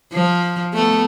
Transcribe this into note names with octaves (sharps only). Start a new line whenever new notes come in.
F3
A3 B3